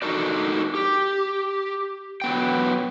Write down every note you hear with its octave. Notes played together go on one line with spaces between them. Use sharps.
D4 D#4 F#4 A4 A#4 D5
G4
F#3 B3 G5